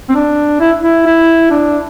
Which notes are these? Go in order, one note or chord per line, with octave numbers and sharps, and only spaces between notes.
C4
D4
E4
E4
E4
D4